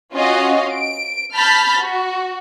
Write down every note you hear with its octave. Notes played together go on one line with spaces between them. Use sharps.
C#4 F4 F#4 D#5 F5
D7
A5 B5 F6 G6 A6 B6
F#4